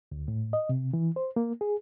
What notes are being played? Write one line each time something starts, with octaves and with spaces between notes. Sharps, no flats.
D2
A2
D#5
C3
E3
C5
A#3
G#4